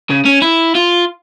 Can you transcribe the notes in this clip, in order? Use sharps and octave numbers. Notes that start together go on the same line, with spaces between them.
C#3
C#4
E4
F4